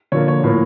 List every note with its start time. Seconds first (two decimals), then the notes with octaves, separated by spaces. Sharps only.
0.12 D3 F3 A#3 C#5
0.28 C#5
0.44 A2 F3 A#3